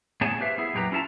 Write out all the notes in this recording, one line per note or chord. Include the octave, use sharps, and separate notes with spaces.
A2 B3 G#4 C#5 G#5 A5
G4 B4 C5 E5 F5
B3 E4 G#4
F2 A#2 F#3 G4 B4 A#5
C#4 E4 F4 E5 A5 A#5